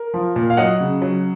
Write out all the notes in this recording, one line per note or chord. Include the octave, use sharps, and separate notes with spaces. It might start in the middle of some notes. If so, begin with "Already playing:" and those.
Already playing: A#4
F3
A#2
F5
F#3 D#5 F#5
C#3
F#3